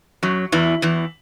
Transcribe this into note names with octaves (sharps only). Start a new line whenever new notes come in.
F#2 F#3
E2 E3
E2 E3